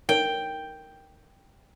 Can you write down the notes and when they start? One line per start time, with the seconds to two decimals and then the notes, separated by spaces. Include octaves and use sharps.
0.09 D#4 A#4 C#5 G5